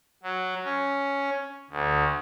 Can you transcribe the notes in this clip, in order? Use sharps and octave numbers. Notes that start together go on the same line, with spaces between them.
F#3
C#4
D2